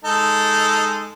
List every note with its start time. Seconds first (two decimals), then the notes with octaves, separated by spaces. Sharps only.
0.05 G#3 D#4 A4